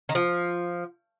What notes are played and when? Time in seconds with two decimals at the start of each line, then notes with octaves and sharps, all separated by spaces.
0.09 D#3
0.15 F3